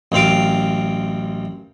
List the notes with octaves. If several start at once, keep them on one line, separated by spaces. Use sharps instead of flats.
A1 F#2 C4 F5 D6